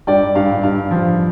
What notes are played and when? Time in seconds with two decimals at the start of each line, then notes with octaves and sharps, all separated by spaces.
0.07 G2 D5 G5
0.35 G2 F5
0.63 G2 F5
0.91 F3